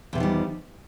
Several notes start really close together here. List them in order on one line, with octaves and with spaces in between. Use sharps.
E2 C3 F3 D#3 G3